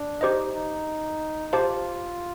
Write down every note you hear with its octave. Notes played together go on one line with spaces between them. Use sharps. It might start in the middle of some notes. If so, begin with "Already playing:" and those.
Already playing: D4
D#4 G4 C5 D#5
D#4
F4 G4 C5 F5 A5